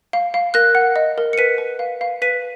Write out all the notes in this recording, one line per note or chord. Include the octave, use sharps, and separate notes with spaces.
F5
F5
A#4 F#6 A#6
F#5
D#5
A#4
C#7
B4 B6 D#7
B4
F5
F5
B4 B6 D#7